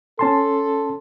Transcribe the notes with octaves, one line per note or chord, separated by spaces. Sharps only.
C#4 A4 A5 C6